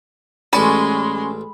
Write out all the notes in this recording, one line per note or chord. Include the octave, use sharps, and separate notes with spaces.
A1 G#3 C#4 D5 A5 B5 C6